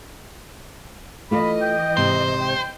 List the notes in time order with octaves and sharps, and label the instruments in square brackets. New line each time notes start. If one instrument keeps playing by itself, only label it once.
[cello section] E3 D#5 [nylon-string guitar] A3 F4 A4 [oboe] B5
[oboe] G5
[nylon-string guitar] G#2 C3 [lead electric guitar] C5
[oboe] G5